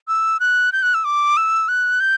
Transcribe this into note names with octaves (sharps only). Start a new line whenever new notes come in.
E6
F#6
G6
F#6
E6
D6
E6
F#6
G6